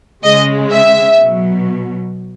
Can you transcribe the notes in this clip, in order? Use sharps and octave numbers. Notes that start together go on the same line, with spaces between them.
C#3 G#3 D#5
E5
B2 F#3